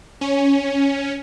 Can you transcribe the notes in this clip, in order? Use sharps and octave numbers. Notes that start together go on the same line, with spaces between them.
C#4